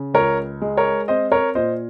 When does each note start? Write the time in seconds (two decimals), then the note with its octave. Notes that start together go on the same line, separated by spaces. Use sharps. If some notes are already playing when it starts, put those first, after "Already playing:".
Already playing: C#3
0.14 C#2 A#4 C#5
0.62 G#3
0.77 A#4 C#5
1.08 C4 C5 D#5
1.32 A#4 C#5
1.55 A#2 C5 D#5